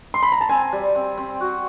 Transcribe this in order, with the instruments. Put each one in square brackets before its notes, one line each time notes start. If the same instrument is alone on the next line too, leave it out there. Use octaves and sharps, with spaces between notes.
[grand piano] C6
B5
A#5
A5
[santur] C4 [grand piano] G#5
[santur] G3
C4
C4
F#4